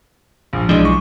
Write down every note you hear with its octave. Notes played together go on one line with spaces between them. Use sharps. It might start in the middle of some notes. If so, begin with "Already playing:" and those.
A#1 F3
B1 E3 F3 G#3 D4
C#6